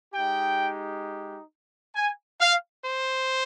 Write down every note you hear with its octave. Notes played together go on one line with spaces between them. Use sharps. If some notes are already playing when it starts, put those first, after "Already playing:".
G#3 D#4 G4 G5
G#5
F5
C5